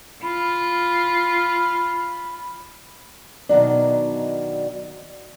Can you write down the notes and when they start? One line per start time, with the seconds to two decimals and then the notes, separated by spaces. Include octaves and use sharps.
0.23 F4 B5
3.49 B2 D#3 E3 F#3 D4